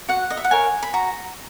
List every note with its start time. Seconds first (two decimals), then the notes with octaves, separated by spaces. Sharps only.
0.08 F#4 F#5
0.30 D#5
0.37 E5
0.44 F#5
0.51 A#4 C#5 G#5
0.83 B5
0.93 F#4 A#5